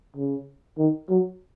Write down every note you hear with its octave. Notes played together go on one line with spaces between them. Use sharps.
C#3
D#3
F#3